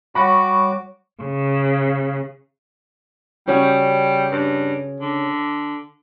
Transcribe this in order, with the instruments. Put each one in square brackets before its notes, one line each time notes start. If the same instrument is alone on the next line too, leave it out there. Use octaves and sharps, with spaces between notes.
[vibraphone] G3 C#5 C#6 [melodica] F#4 D6 [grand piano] F#5 B5
[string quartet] C#3
[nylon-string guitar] C#3 C#4 F#4 [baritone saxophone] G3
[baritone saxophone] G2
D3